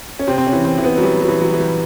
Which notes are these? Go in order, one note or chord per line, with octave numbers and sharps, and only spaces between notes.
C#4
C3 C4
C4
C#4
E3
C4
E3
B3
F#3
E3 G3
F#3
E3
F#3
E3
G3